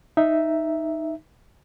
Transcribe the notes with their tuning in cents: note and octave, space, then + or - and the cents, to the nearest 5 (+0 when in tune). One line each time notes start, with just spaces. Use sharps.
D#4 +0 E5 +0